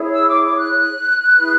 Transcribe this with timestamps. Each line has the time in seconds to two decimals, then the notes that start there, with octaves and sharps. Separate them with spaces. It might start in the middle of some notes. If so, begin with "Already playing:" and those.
Already playing: E4 G#4 C#5
0.12 E6
0.27 D6
0.43 D6
0.58 F#6
1.36 E4 G#4 B4